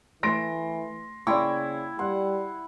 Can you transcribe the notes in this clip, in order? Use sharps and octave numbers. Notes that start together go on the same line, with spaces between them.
E3 A3 C6 A#6 D7
C#3 A#3 E4 D5 G5 C6 C#6
G3 F#5 C6